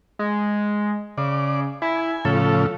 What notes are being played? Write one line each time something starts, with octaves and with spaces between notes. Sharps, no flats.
G#3
C#3 D5
E4 G#5
A2 C#3 F3 A4